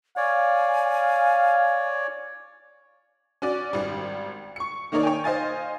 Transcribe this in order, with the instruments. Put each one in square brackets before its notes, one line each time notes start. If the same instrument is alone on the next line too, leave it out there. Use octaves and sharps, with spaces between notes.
[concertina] C#5 D5 [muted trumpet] F5 [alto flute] G#5
[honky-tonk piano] C#4 F#4 D5
G#1 G3
C#6 C#7
D#3 A#3 D#4 A#4 C#5 D5
C#5 G5 G#5
C5 D#5 F5 G#5 A6